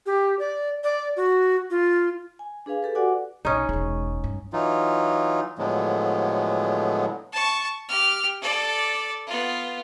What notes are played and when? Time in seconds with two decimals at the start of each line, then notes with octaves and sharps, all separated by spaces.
0.06 G4
0.39 D5
0.84 D5
1.17 F#4
1.70 F4
2.39 G#5
2.66 D4 G#4 B4 F5 G#5
2.83 G4 A4 B4
2.95 F#4 D5 F#5 G#5 D6
3.45 B1 C#4 D#4
3.69 E1 G#3
4.24 G2
4.53 E3 F#3 D#4 F4
5.58 A2 D3 F3 F#3 G#3 B3
7.32 A5 C#6
7.88 G4 F6
8.41 A4 D5
9.27 B3 F4